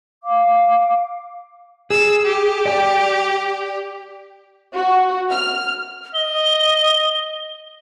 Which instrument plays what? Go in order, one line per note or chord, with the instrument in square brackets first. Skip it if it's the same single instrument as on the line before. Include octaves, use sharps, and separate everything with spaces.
[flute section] F5 D6
[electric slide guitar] G#4 [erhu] E6
[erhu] G4
[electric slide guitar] D5 G5
[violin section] F#4
F6
[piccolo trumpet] D#5 [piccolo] G7